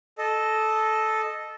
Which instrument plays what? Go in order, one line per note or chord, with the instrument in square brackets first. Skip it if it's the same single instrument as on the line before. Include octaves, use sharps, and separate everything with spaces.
[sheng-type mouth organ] A4 D#5